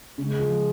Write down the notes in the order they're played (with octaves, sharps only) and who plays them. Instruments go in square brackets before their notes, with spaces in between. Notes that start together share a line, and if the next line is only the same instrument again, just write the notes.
[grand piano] C#3 [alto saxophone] G#3
[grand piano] F3